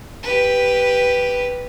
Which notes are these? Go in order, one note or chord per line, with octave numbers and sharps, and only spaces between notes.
G4 B4